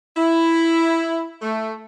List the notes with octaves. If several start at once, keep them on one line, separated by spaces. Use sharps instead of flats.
E4
A3